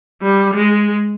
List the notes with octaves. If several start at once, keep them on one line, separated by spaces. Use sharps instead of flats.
G3
G#3